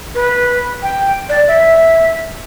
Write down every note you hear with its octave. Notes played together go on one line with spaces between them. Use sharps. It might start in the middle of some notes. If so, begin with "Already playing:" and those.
B4
G5
D5
E5